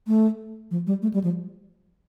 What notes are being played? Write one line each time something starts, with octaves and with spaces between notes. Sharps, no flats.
A3
F3
G3
A3
G3
F3